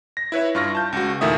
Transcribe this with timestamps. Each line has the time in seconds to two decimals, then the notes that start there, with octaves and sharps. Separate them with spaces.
0.17 A#6
0.32 E4 B4 C#5 E5
0.55 G2 F4 C#6 F6 A#6
0.75 A5 G6
0.93 C#2 F#4
1.21 E2 A#2 D#3 A3 E5 D#6